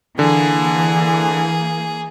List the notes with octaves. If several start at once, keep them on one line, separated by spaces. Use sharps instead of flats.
D3 E3 A#3 G#4